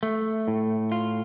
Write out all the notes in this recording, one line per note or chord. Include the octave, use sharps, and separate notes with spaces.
A3
A2
F4